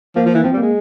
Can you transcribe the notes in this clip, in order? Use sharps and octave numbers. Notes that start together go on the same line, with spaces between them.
F3 A#3
F3
E3
F3 C4
G3 A#3
G#3